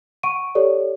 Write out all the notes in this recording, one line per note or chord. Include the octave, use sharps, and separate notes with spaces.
F#5 C#6 D7 D#7
G4 A4 C#5 D5